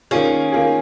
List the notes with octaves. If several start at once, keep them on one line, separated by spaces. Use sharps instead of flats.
D#3 A#3 C#4 F4 G#4
D#3 A#3 F4 G#4